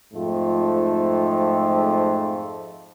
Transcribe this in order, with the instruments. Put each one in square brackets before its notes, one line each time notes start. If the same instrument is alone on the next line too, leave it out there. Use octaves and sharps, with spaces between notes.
[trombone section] F2 G#2 A3 C4 F4